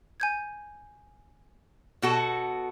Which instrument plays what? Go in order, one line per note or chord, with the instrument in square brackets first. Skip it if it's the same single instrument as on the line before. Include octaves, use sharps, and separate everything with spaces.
[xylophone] G#5 G6 G#6
[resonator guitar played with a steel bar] B2 F#4 A4